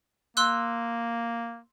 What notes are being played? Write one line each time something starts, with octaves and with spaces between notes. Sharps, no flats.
A#3 C6 E6 F#6